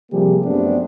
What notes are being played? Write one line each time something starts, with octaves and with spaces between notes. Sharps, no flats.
C3 F3 G3 A#3 G4 G#4
F#2 F#3 A3 B3 C4 D4